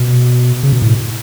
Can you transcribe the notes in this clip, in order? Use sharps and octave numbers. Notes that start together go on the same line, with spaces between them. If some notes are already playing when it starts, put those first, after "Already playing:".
Already playing: B2
C#3
B2
A2